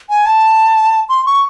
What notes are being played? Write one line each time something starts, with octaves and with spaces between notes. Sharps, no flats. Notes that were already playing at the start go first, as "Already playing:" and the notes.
G#5
A5
C6
C#6